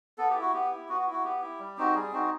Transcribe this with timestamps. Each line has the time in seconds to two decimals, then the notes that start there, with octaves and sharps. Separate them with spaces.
0.18 B3 A4
0.30 E4 G4
0.41 F#4
0.53 B3 G4
0.71 E4
0.89 B3 F#4
1.01 F#4
1.07 E4
1.12 F#4
1.24 B3 G4
1.42 E4
1.60 G3
1.78 C4 D#4 F#4
1.95 G3 G#4
2.12 C4 D#4 F#4